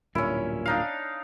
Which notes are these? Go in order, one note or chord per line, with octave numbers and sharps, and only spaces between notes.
D1 G2 A#2 C#4 E4
D4 D#4 F5